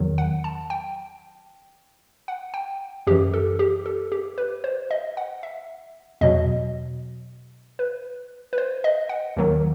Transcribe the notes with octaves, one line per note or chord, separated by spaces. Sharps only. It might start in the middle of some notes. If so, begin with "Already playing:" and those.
Already playing: E2 D#3 F#3
F#5
A5
G5
F#5
G5
F#2 E3 G4
A4
G4
A4
G4
B4
C5
D#5
F#5
E5
E2 B2 F#3 D#5
B4
B4
C5
D#5
F#5
D#2 D#3 F#3